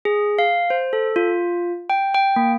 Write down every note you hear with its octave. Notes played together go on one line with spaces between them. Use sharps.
G#4
F5
C5
A4
F4
G5
G5
A#3